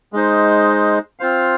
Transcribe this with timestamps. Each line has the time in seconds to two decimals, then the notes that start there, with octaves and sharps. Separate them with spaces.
0.13 G#3 D#4 C5
1.19 C4 F4 C5 F5